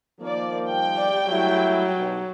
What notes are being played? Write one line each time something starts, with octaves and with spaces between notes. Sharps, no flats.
D#3 F3 A#3 D5
G3 G5
D5
F#3 A3 E4
B1